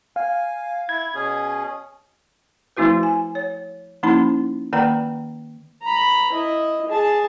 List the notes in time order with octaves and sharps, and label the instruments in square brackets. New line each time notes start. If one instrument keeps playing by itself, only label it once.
[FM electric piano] F5 [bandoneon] G#5
[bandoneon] E4 [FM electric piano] G#6
[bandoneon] B2 C#4 G#4
[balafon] F3 A3 C4 E4 F#4 B4
G#5
C#5
F3 A#3 C#4 D#4 E4 B5
D#3 A#3 B4 D5 G5 A#5
[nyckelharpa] A#5 B5
E4 D#5
G#4 A5